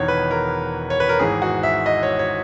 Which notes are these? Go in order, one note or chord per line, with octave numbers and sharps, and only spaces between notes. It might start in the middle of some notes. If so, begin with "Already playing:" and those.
Already playing: E1 E2 D#3 C#5
B4
A#4
C#5
B4
A#4
G#1 G#2 E3 G#4
F#4
E5
D#5
C#5
C#5